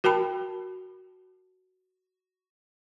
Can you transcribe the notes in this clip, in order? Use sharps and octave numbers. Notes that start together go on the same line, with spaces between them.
F#4 A#4 G5 A5 B5